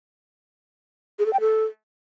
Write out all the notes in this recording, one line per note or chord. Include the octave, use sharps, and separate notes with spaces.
G#4
A4
G5
A4